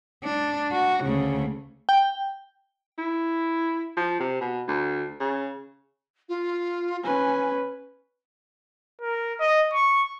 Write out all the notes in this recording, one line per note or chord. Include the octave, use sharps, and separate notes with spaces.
D4
F#4
D2 C#3
G5
E4
F3
C3
B2
D2
C#3
F4
C#4 B4 G#5
A#4
D#5
C#6